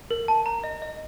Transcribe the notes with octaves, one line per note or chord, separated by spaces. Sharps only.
A#4
A5
A#5
D#5
D#5